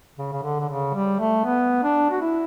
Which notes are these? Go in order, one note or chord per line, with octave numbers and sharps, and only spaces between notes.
C#3
C#3
D3
D3
C#3
G3
A3
B3
D4
F#4
E4